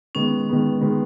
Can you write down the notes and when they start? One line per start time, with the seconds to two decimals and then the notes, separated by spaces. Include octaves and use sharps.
0.15 D#3 G#3 B3 C#4
0.49 D#3 G#3 B3
0.81 D#3 G#3 B3